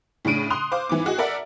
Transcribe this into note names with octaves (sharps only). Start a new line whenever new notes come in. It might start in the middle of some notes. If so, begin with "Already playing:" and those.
A2 C#3 D4 D7 D#7
C6 D#6 F#6 F7
C5 F5 D6
G#2 E3 B3 D6
F#4 G#4 D#5
A4 A#4 D5 E5 F#5